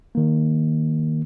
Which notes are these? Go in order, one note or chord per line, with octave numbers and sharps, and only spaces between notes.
D#3 A#3